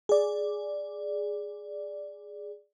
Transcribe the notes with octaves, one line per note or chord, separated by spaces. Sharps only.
G#4 D5